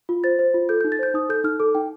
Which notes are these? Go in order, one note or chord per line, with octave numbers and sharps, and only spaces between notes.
F4
C5 A6
C5
F4
A4 G6
G6
D#4
A6
C5 G6
D#4 D#6
A4 G6
D#4 F6
A4 D6
D#4 G5